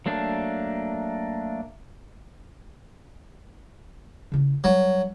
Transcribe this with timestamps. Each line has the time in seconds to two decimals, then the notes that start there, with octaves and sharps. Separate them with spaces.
0.06 F#3 A3 A#3 D4
4.32 C#3 E4
4.64 F#3 G3 D4